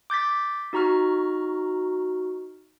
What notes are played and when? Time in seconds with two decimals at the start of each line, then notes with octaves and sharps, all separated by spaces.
0.10 D6 G6 A6 B6
0.73 D#4 F#4 A#5 C#6 F6